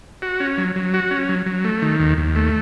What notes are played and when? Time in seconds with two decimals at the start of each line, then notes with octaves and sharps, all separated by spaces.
0.22 F#4
0.40 C#4
0.58 F#3
0.76 F#3
0.94 F#4
1.11 C#4
1.29 F#3
1.46 F#3
1.64 A3
1.82 D#3
2.00 D#2
2.18 D#2
2.35 A3